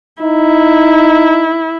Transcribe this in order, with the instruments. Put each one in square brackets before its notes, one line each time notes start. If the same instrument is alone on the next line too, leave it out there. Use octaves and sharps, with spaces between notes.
[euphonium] D#4 [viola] E4